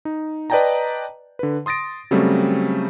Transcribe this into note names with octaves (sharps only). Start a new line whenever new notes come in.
D#4
B4 D5 D#5 G5 A5 A#5
D3 B4
C6 D#6 A6 A#6 D7
C#3 F#3 G3 A3 C4